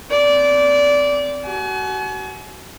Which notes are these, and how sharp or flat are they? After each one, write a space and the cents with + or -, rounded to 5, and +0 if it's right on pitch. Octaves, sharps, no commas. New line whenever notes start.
C4 -10 D5 -20
F#4 +30 G#5 +40